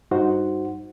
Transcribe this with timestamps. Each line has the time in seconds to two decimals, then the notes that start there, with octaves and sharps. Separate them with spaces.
0.11 G2 D#4 F#4 C5 F#5